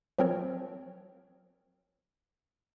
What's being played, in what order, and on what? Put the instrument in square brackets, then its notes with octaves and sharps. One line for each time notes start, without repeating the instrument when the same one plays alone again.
[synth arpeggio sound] F3 F#3 C4 A#4 C#5